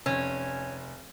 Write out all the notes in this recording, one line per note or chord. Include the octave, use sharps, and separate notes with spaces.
F1 C#4